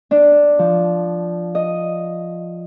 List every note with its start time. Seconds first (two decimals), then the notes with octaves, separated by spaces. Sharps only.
0.11 D4
0.59 F3
1.55 D#5